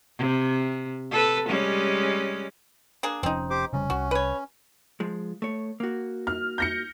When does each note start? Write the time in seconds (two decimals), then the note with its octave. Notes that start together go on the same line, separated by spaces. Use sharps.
0.18 C3
1.11 A4 B4
1.48 G3 G#3 C#4
3.03 A#3 D4 G#4
3.23 F1 F3 C4 C#4 D#4
3.50 G4 C5 D6
3.73 F1 C#3 G3 C#4
3.90 C2 F#4
4.11 B4 C#5
5.00 F3 G#3
5.42 A3 C#5
5.80 A#3 F#4
6.27 F6
6.58 G6 A#6 C#7